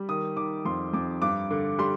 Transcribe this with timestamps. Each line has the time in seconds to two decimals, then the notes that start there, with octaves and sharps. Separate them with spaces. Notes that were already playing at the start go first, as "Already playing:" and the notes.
Already playing: G3
0.09 D#3 D#6
0.36 D#3 D6
0.65 F2 C6
0.93 F2 D6
1.22 G2 D6
1.51 D3
1.79 G3 C6